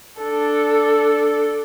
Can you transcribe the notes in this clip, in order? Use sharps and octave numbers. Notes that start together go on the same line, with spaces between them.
D4 A4